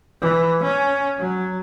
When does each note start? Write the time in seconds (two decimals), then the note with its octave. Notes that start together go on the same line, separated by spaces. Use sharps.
0.21 E3
0.63 C#4
1.18 F#3